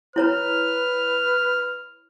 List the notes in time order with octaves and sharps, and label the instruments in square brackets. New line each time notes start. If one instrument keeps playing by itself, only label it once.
[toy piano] E4 C#5 A#5 [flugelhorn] B4 [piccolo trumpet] F6